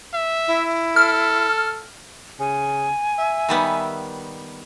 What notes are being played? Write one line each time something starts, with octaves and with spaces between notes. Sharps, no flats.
E5
E4
A4 F6
C#3 G#5
E5
D#3 G3 B3